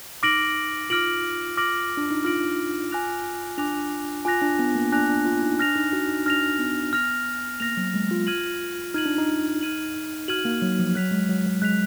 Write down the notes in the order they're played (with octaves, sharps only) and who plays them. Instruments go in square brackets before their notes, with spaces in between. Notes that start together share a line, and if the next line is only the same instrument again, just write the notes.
[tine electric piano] D#4 [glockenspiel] D6 F6 A#6 D7 F#7
[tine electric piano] F4 [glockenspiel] D6 F6 A#6 D7 F#7
[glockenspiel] D6 F6 A#6 D7 F#7
[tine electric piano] D4
D#4
[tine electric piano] F4 [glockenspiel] D6 F6 A#6 D7 F#7
[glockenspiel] G#5 D6 F#6 A#6 F7
[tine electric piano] D4 [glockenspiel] G#5 D6 F#6 A#6 F7
[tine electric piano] F4 [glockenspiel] G#5 D6 F#6 A#6 F7
[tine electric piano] D4
B3
A#3
[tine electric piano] D4 [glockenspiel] G#5 D6 F#6 A#6 F7
[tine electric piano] D4
F4
D#4
[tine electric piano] D4 [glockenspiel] F6 A#6 F7
[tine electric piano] D#4
F#4
D#4
[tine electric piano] D4 [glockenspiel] F6 A#6 F7
[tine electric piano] B3
[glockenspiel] F6 A#6 F7
[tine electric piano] A#3 [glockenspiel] F6 A#6 F7
[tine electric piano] F#3
G#3
F4
[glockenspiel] F6 G#6 D#7 F#7
[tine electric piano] D#4 [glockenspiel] F6 G#6 D#7 F#7
[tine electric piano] D4
D#4
[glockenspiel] F6 G#6 D#7 F#7
[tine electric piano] F#4 [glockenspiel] F6 G#6 D#7 F#7
[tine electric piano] A#3
F#3
F3
[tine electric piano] F#3 [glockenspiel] F#6 B6 F7
[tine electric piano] G#3
F#3
F#3
[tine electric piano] G#3 [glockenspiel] F#6 B6 F7